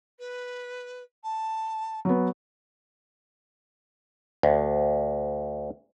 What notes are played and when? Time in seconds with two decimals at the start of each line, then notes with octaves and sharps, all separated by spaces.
0.19 B4
1.23 A5
2.05 F#3 B3
4.43 D2